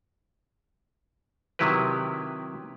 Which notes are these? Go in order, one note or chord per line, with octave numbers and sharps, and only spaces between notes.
C3 D#3 F#3 E4 G4 B4